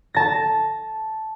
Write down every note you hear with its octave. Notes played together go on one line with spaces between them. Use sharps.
A5 A#6